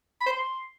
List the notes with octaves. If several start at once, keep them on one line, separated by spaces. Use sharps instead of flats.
B5
C5
C6